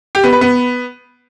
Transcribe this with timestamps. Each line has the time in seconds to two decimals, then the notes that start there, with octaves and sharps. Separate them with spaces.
0.15 G4
0.24 B3
0.32 B4
0.41 B3